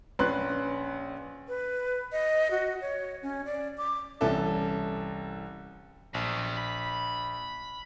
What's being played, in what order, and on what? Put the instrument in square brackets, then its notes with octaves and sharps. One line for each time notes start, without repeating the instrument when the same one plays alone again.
[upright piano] A#1 C#4 B4 C6 F#6
[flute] B4
D#5
F#4
C#5
C#4
D5
D6
[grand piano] C2 E3 C#4 A4 E5
[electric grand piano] A#1 [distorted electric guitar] B2 F#3
[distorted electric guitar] B5